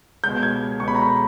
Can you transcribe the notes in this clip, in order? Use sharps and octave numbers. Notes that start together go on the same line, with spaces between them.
C#2 B2 G6
G#6
C#2 B2 C#6
B5
A#5
B5